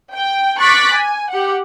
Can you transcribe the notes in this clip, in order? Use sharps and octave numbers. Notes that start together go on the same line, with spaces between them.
G5
C#6 D6 F#6 A6 B6 D7
G#5
G4 F#5